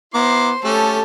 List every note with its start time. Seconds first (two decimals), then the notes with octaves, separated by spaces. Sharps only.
0.14 B3 E4 C5 A#5 C6 D6
0.64 A3 C#4 G4 A4 A5